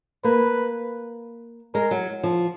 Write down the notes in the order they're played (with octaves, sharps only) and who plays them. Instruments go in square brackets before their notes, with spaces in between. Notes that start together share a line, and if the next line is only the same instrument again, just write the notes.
[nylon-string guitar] A#3 [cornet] B4
[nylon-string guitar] G#3 [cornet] A#4
[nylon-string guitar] F#3
F3